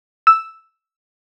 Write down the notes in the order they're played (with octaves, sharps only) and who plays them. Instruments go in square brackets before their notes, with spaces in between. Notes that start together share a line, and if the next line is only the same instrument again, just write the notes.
[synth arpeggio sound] E6